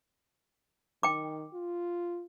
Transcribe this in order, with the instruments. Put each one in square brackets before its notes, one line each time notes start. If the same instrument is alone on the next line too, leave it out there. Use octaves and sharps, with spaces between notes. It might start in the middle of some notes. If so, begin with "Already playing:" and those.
[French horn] D#3 [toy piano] G5 D6
[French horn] F4